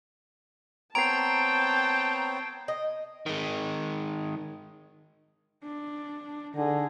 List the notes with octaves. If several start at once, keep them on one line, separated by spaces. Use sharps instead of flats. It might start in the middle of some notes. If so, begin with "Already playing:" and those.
B3 C4 C#5 G5 A5 A#5 C7 D7
D#5
D#3 G#3
D4
D3 D#4 G#4